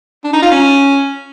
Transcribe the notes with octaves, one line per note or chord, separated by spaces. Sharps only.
D4
D#4
F4
C#4